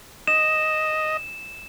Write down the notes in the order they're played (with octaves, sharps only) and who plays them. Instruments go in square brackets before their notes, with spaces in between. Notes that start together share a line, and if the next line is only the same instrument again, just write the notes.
[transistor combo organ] D#5 [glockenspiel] E7